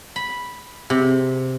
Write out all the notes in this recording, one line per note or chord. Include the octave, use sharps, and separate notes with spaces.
B5
C3